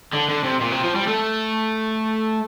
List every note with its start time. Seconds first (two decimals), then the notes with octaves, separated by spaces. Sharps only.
0.13 D3
0.29 D3
0.44 C3
0.60 A#2
0.72 C3
0.83 F3
0.95 G3
1.07 A3